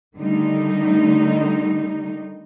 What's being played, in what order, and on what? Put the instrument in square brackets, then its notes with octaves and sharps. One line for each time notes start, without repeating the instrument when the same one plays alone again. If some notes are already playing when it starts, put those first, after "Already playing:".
[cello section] D3 D#3 G3 A3 D#4